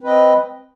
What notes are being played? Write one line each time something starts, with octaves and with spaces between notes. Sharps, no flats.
C4 B4 D#5